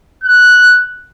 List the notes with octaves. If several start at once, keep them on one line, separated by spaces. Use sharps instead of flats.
F#6